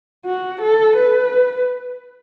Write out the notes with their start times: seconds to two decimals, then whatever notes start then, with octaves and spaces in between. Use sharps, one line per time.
0.26 F#4
0.62 A4
0.97 B4